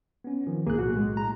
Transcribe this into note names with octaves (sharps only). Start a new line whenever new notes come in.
B3 C#4
D#3 F3
B1 A2 A#3 G#4 F#6
F#4
G#3
A#5